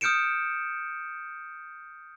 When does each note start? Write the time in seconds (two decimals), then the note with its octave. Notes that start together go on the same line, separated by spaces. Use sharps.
0.01 D#6 F6 G6 C#7 D7 E7